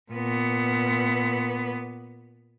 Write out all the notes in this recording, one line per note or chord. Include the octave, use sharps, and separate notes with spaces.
A#2 B3